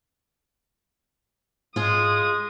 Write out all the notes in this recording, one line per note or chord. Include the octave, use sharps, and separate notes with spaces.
G#2 G#3 F4 G#4 D#6